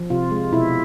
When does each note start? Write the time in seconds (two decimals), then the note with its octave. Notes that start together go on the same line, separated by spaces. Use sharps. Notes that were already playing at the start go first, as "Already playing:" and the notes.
Already playing: F3
0.10 C3 F4
0.31 G#3
0.52 B2 E4